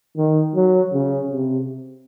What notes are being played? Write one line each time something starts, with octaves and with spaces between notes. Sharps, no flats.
D#3
F#3
C#3
C3